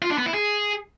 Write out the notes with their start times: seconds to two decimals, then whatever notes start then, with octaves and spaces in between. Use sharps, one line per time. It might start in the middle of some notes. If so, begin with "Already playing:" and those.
0.02 F4
0.10 D4
0.18 B3
0.26 E4
0.34 G#4